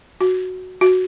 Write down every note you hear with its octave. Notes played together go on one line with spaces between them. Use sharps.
F#4
F#4